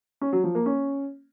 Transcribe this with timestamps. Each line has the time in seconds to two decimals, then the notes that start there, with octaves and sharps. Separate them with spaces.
0.21 C#4
0.33 F#3
0.44 F3
0.55 A#3
0.66 C#4